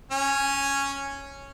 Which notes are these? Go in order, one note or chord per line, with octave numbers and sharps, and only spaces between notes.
C#4 G#5